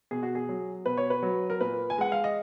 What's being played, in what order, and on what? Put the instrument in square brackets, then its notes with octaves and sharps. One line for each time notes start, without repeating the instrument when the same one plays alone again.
[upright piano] B2 G#4
F#4
G#4
F#3
B2 B4
C#5
B4
F#3
A#4
A#2 B4
G#5
G#3 F#5
F5
D#5